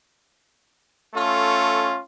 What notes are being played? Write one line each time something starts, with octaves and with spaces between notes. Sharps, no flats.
A3 C#4 F4 A4